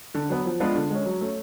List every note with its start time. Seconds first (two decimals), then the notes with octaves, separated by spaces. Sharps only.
0.14 D3
0.30 F#3 B3
0.46 F3
0.60 G#3 B3 D4 F4
0.75 D3
0.90 G#3 C#4
1.06 F#3
1.21 A3 C#4